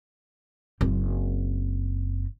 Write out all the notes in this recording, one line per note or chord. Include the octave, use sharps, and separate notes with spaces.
F#1 C4